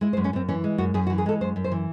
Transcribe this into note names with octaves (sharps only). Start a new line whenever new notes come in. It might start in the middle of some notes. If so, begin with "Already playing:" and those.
G#3 E4
C5
F#2
C#4
F#2 C4
E3 C#4
G#3
F#2 F#4
F#2 G#4
F#4
E3
G#4
G#3 A4
F#2 C5
F#2
C5
E3